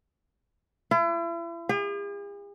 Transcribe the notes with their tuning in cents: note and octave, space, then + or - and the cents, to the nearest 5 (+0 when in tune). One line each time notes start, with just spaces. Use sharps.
E4 +40
G#4 -45